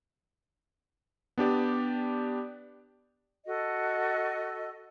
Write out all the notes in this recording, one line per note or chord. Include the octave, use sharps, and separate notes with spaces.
B3 D4 G4 D5
F#4 A4 D#5